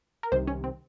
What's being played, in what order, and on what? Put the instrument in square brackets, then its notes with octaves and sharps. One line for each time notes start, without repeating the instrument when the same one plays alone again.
[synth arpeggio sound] A#4
C2 C3 D#3 C5
C#4
C4